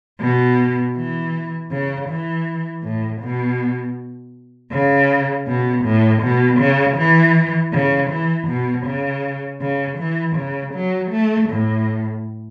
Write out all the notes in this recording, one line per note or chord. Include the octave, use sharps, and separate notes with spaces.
B2
E3
C#3
E3
A2
B2
C#3
B2
A2
B2
C#3
E3
C#3
E3
B2
C#3
C#3
E3
C#3
F#3
A3
A2